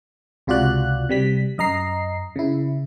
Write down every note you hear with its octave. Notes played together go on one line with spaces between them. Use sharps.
C#2 C3 F4 F#4 D5 F#6
C3 G3 B6
F#2 D#5 A#5 C7
C#3 E4